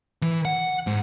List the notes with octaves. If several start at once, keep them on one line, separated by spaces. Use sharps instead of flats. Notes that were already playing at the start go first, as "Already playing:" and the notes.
E3
F#5
G#2